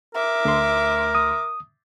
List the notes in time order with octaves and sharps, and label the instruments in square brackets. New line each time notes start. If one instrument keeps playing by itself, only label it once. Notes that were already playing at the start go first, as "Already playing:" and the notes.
[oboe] A#4 [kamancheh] E5 D6
[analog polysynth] D2 C6
[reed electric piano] D#6